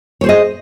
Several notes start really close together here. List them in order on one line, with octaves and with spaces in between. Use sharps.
C#5 C5 G#4 D#5